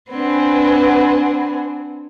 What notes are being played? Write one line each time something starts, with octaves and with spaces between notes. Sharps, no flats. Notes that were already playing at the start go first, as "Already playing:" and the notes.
C4 D4 B4 F#5 G#5